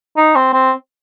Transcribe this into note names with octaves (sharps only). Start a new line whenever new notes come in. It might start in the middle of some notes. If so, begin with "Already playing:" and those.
D#4
C4
C4